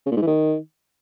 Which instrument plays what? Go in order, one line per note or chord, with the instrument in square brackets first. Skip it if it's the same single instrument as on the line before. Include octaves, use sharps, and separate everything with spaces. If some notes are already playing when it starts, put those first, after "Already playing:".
[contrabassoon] C#3
A#2
G#2
E3
D#3